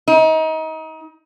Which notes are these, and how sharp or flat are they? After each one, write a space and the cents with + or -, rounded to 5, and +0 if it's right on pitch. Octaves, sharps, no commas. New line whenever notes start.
D#4 +30